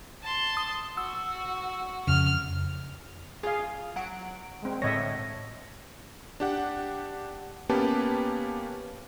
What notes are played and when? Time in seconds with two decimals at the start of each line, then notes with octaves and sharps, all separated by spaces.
0.23 A5 C6
0.57 D#6
0.97 F#4 E6
2.07 F2 C#3 F6
3.43 F4 G#4 F5
3.96 F#3 F#5 D7
4.63 G#3 C4
4.82 A2 D3 C#5 D#5 E5 A#6
6.40 D4 G4 F#5
7.69 A#3 B3 C#4 G4 B4 A5